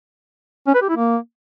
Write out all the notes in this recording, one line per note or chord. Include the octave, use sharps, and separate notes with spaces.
C#4
B4
G4
E4
A#3